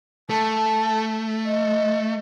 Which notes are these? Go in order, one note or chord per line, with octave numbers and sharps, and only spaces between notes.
A3 A5
D#5